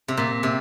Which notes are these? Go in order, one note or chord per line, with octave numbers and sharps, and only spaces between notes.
C3
A#2
C3